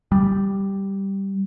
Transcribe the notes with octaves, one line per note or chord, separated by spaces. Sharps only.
G3